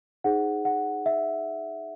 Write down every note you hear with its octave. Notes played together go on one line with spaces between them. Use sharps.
D#4 G#4 C5 F#5
F#5
E5